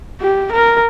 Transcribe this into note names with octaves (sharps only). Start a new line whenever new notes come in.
G4
A#4